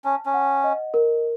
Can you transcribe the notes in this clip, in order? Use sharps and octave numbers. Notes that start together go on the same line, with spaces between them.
C#4 A5
C#4
F#5
D#5
A#4